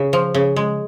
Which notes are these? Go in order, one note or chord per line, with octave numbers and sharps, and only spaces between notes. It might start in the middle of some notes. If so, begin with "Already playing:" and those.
Already playing: C#3
F3
C#3
G#3